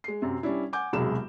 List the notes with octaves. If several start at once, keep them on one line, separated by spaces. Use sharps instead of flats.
G#3 C7
F#2 C3
G3 C#4 D4 E4
F#5 G#5 D6 G6
E1 C2 F#3 G#3 E7